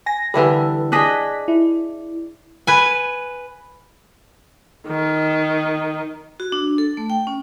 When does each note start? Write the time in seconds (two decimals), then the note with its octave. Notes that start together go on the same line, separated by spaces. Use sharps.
0.06 G#5 A#6
0.34 D3 E3 G3 A4 B4
0.92 D4 G#4 D#5 F#6 B6
1.48 E4
2.67 B4 G#5
4.87 D#3
6.40 F#4
6.52 D4
6.78 A4
6.97 A3
7.10 G5
7.27 C#4